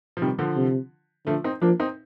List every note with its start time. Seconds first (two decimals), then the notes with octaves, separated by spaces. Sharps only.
0.17 F3
0.22 C3 D#3 G3
0.39 D3 F3
0.57 C3
1.27 D3 F3 A3
1.44 C4 D#4
1.62 F3 A#3 D4
1.80 C4 D#4